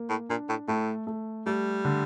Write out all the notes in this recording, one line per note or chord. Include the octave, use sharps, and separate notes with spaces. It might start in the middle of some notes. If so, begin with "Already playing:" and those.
Already playing: A#3
A2
A#2 D4
A2
A2 A3
A3
G3 A3
D3